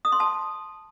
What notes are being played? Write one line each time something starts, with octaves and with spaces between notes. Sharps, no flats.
D#6
C6
A5